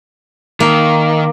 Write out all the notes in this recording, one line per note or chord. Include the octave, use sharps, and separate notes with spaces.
D#3 A#3